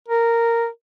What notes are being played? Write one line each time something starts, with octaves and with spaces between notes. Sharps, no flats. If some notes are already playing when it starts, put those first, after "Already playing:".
A#4